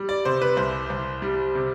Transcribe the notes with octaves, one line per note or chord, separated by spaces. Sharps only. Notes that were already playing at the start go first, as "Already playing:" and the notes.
Already playing: G3
D5
C3 C5
B4
C2 C5
C2
G3
C3